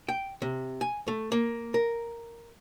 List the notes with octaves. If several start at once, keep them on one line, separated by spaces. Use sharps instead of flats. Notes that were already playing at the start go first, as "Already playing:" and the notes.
G5
C3
G#5
A3
A#3
A#4